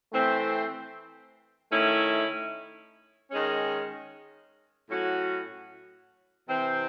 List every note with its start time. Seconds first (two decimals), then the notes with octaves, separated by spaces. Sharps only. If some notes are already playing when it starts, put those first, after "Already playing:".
0.13 E3 A3 C4
1.72 D#3 A3 C#4 E4
3.31 D#3 G#3 C#4
4.89 A2 F#3 C#4 F#4
6.49 C3 E3 C4